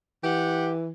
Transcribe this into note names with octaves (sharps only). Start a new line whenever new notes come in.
E3 G4 F#5